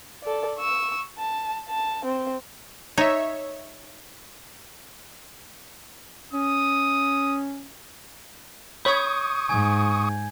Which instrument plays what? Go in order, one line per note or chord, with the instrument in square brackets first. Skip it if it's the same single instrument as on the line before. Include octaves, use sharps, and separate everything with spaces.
[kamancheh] A4 D5
C#6 E6
A5
A5
C4
[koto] D#4 [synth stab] C#5 E5
[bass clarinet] C#4 [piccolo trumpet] D#6
[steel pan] C#5 B5 [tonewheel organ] C#6 D#6 [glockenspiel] G6 G#6
[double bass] G#2 [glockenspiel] G#5 G#6